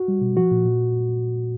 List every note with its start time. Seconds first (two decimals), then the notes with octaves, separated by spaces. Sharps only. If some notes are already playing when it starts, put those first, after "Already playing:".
Already playing: F#4
0.08 G3
0.21 B2
0.37 F3 F#4
0.51 A#2
0.65 A#2